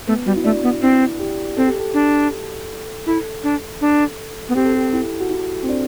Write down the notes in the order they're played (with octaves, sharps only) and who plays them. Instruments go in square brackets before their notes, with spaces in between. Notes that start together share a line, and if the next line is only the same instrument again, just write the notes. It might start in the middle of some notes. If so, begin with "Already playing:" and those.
[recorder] A3 [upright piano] B3
[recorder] G3 [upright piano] F#4
[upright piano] E4
[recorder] A3 [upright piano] D4
[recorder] B3
[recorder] C4 [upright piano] E4
[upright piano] G4
[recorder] C4 [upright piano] A4
[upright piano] G4
A4
[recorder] D4
[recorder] E4 [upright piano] A4
[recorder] D4
D4
B3
[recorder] C4 [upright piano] G4
[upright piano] A4
G4
E4
F#4
E4
C4
D4